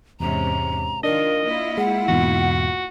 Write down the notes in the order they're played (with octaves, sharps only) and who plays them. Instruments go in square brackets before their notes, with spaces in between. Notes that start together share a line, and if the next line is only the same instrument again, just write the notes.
[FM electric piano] E2 [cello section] G#2 C3 C#4 [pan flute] A#5
[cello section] D#3 F4 [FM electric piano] D4 [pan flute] A#4 [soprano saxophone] D#5
[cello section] A#3 E4 F4
[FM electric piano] G#3 [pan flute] F#5
[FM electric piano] E2 G#2 B2 [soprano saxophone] F#4